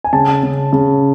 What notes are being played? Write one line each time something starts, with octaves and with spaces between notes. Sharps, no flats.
G#5
C#3 A5
C#3
C#3